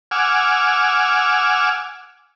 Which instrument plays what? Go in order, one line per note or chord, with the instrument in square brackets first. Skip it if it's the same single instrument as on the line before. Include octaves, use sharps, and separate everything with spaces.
[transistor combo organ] F#5 G#5 D6 E6 F6